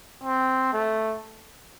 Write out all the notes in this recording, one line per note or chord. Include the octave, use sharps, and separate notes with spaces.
C4
A3